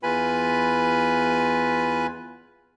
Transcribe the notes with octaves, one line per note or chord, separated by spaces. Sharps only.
E2 F4 B4 G#5 B5